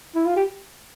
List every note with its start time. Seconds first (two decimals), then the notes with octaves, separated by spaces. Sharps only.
0.15 E4
0.25 F4
0.36 G4